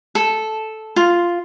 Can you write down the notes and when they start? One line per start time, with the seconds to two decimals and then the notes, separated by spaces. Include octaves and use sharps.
0.15 A4
0.96 F4